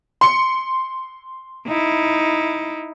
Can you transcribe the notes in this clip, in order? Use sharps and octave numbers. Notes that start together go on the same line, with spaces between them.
C6 C#7
D#4 E4